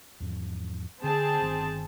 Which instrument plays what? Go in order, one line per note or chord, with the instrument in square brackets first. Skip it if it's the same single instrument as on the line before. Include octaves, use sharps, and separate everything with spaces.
[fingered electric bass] E2 G#2 F3
[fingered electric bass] D3 [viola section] C4 G#4 A5
[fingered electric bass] G1 D#3